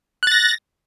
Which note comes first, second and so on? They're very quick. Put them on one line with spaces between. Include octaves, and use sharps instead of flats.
F#6 A6 A#6